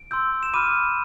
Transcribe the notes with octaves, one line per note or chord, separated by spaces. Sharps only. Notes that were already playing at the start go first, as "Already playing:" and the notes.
Already playing: D7
C6 E6 G6
E7
B5 D6 F6 D#7